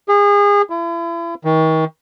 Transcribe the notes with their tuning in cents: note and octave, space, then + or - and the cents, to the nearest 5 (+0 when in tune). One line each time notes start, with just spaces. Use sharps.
G#4 -30
E4 +40
D#3 +40